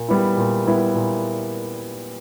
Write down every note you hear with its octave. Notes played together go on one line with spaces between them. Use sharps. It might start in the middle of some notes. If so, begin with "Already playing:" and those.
Already playing: A#2
G3 B3 E4
A#2
G3 B3 E4
A#2